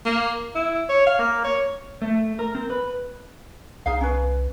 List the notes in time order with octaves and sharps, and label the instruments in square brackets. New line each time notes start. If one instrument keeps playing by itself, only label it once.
[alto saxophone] A#3
E4
C#5
F5
A#3
C#5
[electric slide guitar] A3
A#4
C4
B4
[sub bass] C2 [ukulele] D#4 G#4 F5
[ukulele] C#4 B4